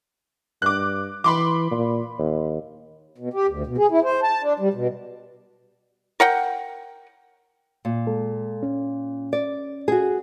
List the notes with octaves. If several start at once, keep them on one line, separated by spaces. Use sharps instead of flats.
G2 D6 F#6
E3 B5 C6 D6
A#2
D#2
B2
G4
D2
B2
G#4
E4
C5
A5
D4
G3
B2
A#4 F#5 G5
A#2
G#3 A4
C#4
D5
F#4 G#4